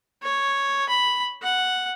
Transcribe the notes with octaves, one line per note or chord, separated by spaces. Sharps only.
C#5
B5
F#5